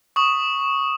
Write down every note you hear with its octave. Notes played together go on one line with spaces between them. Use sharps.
C#6 D#6